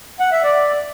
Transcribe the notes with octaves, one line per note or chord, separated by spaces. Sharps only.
F#5
E5
D5